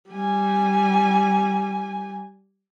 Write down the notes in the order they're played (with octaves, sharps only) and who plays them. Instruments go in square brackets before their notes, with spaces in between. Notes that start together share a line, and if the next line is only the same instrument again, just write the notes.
[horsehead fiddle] G3 G#5